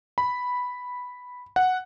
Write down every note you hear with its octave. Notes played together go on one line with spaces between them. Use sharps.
B5
F#5